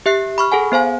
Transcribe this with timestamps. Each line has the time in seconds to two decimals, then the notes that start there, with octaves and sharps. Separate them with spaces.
0.06 G4 E5 F#6 C7
0.38 B5 C#6 F6
0.52 G#4 A4 F#5 G#5
0.72 B3 C5 F5 G#5